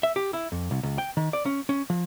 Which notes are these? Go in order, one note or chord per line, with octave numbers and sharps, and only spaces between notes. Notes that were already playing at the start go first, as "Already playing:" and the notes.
E5
G4
E4
F2
C2
C#2
G5
D#3
D5
C#4
C#4
F3